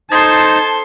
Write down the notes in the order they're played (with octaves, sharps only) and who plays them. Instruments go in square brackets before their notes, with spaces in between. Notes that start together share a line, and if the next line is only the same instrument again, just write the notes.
[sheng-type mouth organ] D#4 C5 [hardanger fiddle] A4 C6 [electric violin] A5 [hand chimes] D#6 G#6 A6